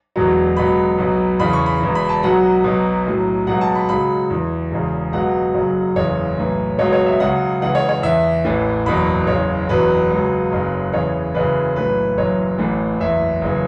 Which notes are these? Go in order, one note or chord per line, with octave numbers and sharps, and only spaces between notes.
E1 E2 B2 F#3
C#2 B2 F#3 B5
B1 B2 F#3
E2 C#3 E3 B5
C#6
B5
E1 E2 E3
B5
A5
B1 B2 F#3 F#5
B1 B2 F#3
B1 A2 F#3
C#2 B2 F#3 F#5
A5
B5
C#2 C#3 F#3 B5
E2 E3
E1 E2 C#3
C#2 B2 F#3 F#5
F#1 F#2 C#3 F#3
F#1 E2 C#3 E3 C#5
B1 A2 E3
C#2 B2 F#3 C#5
C#5
E5
C#2 C#3 F#3 F#5
C#2 C#3 E3 F#5
C#5
C#5
E2 E3 E5
A1 A2 E3
F#1 E2 B2 F#3 B5
F#1 E2 C#3 C#5
F#1 E2 B2 F#3 B4
C#2 C#3 F#3
F#1 F#2 C#3
E2 C#3 E3 C#5
F#1 F#2 C#3 E3 B4
B1 A2 E3 B4
F#1 F#2 E3 C#5
A1 A2 E3
F#1 E2 E3 E5
F#1 C#3 E3